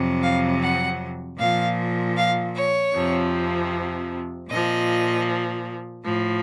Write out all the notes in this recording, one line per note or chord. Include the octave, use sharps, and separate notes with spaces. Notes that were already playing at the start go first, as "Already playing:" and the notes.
Already playing: F2 C3 F#3
F5
F#5
A#2 F3 F5
F5
C#5
F2 C3 F3
A#2 F3 D#5
A2 F3